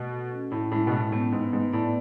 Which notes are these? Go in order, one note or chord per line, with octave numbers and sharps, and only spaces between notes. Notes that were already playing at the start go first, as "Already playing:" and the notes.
Already playing: B2 A3 F#4
A4
C#4
A2 E4
A2 G#3
B2
A2 G#3
A2 B3
G#2 B4
G#2 A3
A2 D5